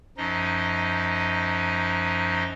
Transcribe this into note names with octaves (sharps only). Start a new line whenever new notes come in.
F#2 F3 D#4 D#5